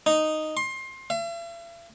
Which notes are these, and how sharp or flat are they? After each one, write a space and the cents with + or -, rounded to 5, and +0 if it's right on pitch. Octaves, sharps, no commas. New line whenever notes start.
D#4 -5
C6 +25
E5 +45